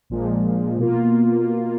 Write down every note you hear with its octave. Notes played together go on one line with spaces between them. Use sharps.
A#1 A#2 F3 G#3
B2 A#3 F4